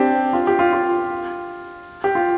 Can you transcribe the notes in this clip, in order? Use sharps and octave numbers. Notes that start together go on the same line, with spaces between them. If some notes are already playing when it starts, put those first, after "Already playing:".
Already playing: C4 D4 G4
F4
G4
F4
F4
G4
F4